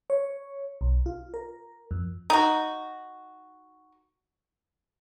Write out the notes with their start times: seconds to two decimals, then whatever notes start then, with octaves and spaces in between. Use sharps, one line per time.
0.10 C#5
0.81 B1
1.06 F4
1.34 A#4
1.91 F2
2.30 D#4 F#4